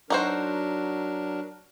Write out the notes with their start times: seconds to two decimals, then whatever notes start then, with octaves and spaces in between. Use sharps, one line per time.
0.10 F#3 D4 D#4 F#4 A#4 C5